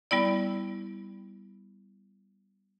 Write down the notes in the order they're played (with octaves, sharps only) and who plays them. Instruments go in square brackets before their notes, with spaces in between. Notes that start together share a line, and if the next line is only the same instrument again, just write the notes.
[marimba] G3 B3 E4 D5